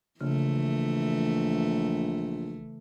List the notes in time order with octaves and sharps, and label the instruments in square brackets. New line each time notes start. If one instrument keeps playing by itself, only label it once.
[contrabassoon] A#1 [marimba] C#3 [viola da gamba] E3 A3